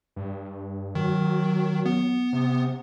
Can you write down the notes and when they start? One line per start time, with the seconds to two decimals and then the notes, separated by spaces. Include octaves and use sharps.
0.16 G2
0.95 D#3 F#3
1.86 B3
2.33 C3